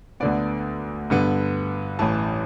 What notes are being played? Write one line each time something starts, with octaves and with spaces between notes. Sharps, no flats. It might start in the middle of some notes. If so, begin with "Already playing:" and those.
D2 D3 B3 D5
G2 D3 B3
A1 A2 E3 A5